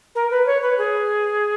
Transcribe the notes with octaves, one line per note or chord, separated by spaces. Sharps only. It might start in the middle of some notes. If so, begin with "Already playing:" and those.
A#4
B4
C#5
B4
G#4